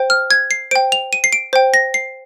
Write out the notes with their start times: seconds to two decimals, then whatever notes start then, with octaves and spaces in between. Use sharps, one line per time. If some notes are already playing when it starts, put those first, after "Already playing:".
Already playing: C5 G5
0.10 F6
0.31 G#6
0.51 C7
0.71 C5 G5 D7
0.92 F7
1.13 D#7
1.24 C7
1.33 D7
1.53 C5 G5
1.74 A#6
1.94 C7